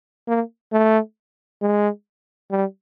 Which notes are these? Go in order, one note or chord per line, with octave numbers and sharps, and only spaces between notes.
A#3
A3
G#3
G3